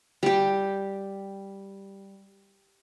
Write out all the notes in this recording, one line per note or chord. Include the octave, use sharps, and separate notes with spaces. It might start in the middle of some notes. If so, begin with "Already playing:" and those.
G3 G4